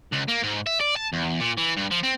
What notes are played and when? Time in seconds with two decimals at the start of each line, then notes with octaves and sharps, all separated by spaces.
0.13 C#2
0.28 A#3
0.43 G#2
0.67 E5
0.81 D5
0.96 A5
1.13 E2
1.40 A#2
1.57 E3
1.77 G2
1.91 F3
2.03 C4